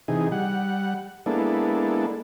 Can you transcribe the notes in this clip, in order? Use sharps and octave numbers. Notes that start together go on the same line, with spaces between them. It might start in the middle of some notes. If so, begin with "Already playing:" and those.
C3 E3 D#4 G#4
G3 F#5
G#3 A#3 B3 D4 E4 A4